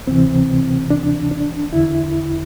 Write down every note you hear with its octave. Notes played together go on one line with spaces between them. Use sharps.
D2 C3 E3 C4
D4
D4
E2 D3 E4